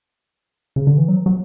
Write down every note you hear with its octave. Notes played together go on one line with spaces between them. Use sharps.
C#3
D3
E3
F#3
F#3